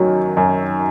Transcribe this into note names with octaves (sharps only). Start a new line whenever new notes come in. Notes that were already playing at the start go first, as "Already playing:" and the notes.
Already playing: F#2 D#3 F#3
F#2